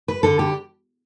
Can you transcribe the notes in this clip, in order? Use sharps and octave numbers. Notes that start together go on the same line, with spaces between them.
B4
D3 A4
G4